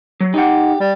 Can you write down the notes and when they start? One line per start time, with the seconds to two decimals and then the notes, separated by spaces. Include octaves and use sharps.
0.21 F#3
0.34 D#4 G4 F#5
0.80 G3